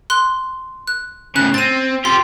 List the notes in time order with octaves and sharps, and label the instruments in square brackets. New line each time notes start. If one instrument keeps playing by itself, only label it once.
[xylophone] C6 F#6 G7
F#6
[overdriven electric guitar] A2 C#3 [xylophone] F#6
[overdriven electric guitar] C4 [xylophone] A6 D#7
[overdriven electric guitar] F4 G4 [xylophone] C6